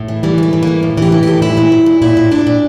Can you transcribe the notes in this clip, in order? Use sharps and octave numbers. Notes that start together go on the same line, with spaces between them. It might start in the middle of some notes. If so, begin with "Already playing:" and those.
Already playing: A2
E3
E3 G3
A2 A3
E3
A2 A#3
A2
E3 G4
E3
A2 G4
A#2 E4
A#2
A#2
A#2
A#2 E4
A#2
A#2 D4
A#2